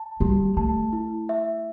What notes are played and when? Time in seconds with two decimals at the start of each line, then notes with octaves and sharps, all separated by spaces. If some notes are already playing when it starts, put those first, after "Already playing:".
Already playing: A5
0.20 G3 G4
0.57 A3 A5
0.93 E4
1.29 E5